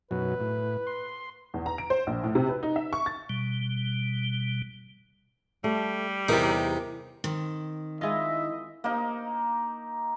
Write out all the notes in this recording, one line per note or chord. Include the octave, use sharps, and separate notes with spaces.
F#2 B2 F#3 B4
A2
C6
E2
A#5
D7
C5
A#1
A2
C3
B4
D#4
E5
C#6
A6
B2 G3
G3 A3
E2 C3 D#4 A#4
D#3 C4
G#3 E4 F4 D#5 E5
A#3 D#4